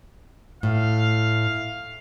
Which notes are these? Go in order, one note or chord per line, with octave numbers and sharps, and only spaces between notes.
A2 F5